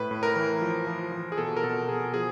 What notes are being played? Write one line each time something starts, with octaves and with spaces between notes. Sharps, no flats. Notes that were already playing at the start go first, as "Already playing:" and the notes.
Already playing: A2 B4
A2
A#4
E3
F3
F3
F3
G#4
B2 A4
A#4
B2 A4
B2 G#4
F3 G#4